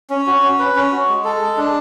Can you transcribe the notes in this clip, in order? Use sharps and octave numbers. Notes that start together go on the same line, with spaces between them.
C#4
F#4
C#4
B4
C#4
F#4
G#3
A4
G#3
D4